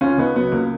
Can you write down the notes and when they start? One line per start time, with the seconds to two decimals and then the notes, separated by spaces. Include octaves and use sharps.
0.01 C#2 C#4 F4
0.18 C#2 B3 D#4
0.35 F#3 B3
0.52 C#2 A#3